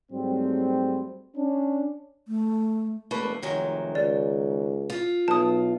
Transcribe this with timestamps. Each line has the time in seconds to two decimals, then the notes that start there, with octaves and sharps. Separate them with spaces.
0.12 G#2 F#3 G3 A3 C4
1.36 C#4 D4
2.28 A3
3.11 E1 A3 A#3 B4
3.43 F1 D#3 F#3 G#3
3.95 C#2 D5
4.90 F4
5.28 B1 A5 D#6